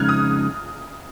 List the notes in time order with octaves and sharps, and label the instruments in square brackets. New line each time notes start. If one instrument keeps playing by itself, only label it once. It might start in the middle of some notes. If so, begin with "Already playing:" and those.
Already playing: [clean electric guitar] F2 C#3 G#3 D#4 [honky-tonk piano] F6 F#6 G#6
[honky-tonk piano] D#6